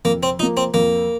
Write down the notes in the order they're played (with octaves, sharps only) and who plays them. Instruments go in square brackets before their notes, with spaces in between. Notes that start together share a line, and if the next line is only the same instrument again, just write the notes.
[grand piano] F2 [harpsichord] A#3
[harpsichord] C4
[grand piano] F3 [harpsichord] D#4
[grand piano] A#3
[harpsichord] C4
[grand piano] F2 [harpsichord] A#3